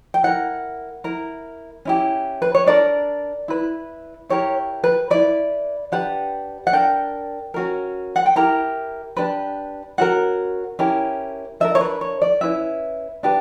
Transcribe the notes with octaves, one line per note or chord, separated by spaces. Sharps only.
G5
E4 A#4 F#5
E4 A#4
C#4 E4 G4
B4
C#5
D4 A#4 D5
E4 B4
E4 G4 A#4 C#5
B4
E4 B4 D5
D4 G4 B4 F#5
F#5
D4 A#4 G5
C#4 F#4 A#4
F#5
G5
E4 G4 A#4 A#5
D4 G4 B4
C#4 F#4 A#4 F#5
C#4 E4 G4 A#4
D4 A#4 E5
C#5
B4
C#5
D5
C#4 E4 B4 E5
D4 G4 B4